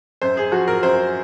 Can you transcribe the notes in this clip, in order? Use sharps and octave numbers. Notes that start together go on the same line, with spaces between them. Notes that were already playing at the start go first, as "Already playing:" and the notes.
F#2 C5
G#4
F3 F#4
A#4
F#2 C5